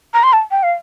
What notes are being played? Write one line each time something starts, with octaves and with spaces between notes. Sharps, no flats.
A#5
C6
A5
G5
F5